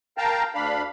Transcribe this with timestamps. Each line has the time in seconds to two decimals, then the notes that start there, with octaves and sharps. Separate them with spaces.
0.18 A#4 F5 G5 A5 A#5
0.55 D2 D4 F5 B5